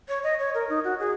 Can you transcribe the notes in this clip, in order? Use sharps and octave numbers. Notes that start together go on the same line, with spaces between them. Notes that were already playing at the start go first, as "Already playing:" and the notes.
C#5
D#5
C#5
A#4
D#4
F#4
G#4